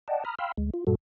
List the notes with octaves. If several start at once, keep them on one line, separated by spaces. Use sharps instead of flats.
D5 D#5 F#5 G5 A5
A#5 B5 D#6 F6
F5 G5 B5 C6 E6 F6
D2 G#3
F4
F#2 A#2 G3 F#4 A4